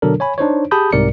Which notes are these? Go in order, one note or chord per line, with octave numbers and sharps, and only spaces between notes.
B2 D3 F#3 D4 A4 A#4
C#5 G#5 B5
D4 D#4 C5 C#5
G4 G#4 A5 B5 D#6 G6
C2 G#2 C3 A#4 D5 C#7